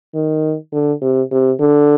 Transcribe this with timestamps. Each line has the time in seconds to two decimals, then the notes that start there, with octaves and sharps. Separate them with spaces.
0.14 D#3
0.72 D3
1.02 C3
1.31 C3
1.60 D3